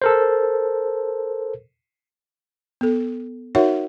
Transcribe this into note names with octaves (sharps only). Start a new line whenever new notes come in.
A4 A#4 C5
B3 A4
D#4 F#4 A#4 C#5 E5 F#5